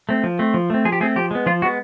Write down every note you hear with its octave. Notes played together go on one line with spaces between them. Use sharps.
A3 C4
F3
A3 C4
F3
A3 C4
F3 G#4
G4
A3 C4 G#4
F3 G4
G#3 B3
F3 F4
G#3 B3 F#4